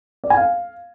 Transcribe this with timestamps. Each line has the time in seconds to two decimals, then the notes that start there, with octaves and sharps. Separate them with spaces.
0.24 D5
0.30 G#5
0.37 F5